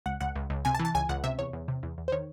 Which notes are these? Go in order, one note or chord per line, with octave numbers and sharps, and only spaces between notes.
C#2 F#5
C#2 F#5
C#2
C#2
C3 G#5
A5
E3
A5
C#2 G#5
C#2 F#5
C3 E5
E2 C#5
E2
C3
E2
E2
C5
D#3 C#5